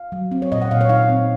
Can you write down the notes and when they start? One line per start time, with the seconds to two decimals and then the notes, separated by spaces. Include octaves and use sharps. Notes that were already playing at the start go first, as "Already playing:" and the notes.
Already playing: F5
0.12 F#3
0.31 C4
0.42 C#5
0.52 A#2 D#5
0.61 F#5
0.71 A#2 F5
0.81 C#5
0.89 D#4 F5
1.09 C4